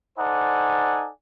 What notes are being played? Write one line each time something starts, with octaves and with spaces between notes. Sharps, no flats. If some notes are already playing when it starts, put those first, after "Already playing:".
D#4 A4 C5 D5 F#5 G#5